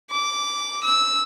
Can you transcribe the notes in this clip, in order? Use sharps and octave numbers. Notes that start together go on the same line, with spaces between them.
D6
E6